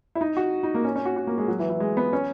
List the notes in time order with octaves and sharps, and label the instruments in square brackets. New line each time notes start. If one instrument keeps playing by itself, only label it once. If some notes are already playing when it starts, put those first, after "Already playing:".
[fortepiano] E4
D#4
F#4
D#4
A#3
C#4
C#4
F#4
F#4
A#3
G#3
F#3
E3
E3
G#3
B3
C#4